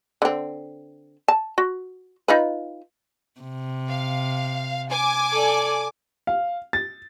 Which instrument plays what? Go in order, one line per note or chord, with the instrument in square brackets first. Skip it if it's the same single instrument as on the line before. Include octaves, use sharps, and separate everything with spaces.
[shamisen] D3 C4
A5
F#4
D#4 F4 B4
[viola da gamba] C3
[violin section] F5
G#5 D6
[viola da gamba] A4 D5
[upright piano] F5
A6